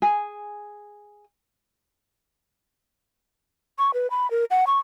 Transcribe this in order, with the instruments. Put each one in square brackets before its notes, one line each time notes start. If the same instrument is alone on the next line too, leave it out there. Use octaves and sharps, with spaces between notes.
[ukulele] G#4
[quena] C#6
B4
B5
A#4
F#5
C#6